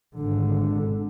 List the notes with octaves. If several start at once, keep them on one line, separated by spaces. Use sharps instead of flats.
G#1 D3